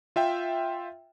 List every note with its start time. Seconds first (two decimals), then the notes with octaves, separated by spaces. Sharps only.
0.16 F4 E5 G5